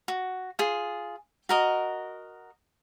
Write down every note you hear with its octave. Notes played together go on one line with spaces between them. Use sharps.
F#4
F4 G#4
F#4 A#4 D#5